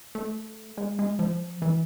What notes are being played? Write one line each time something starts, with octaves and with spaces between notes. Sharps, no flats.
A3
G#3
G#3
F3
E3